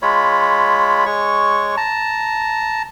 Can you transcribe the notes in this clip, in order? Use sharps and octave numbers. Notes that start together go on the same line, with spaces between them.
G#3 F4 C#5 B5
G#3 C#5 C#6
A5 A#5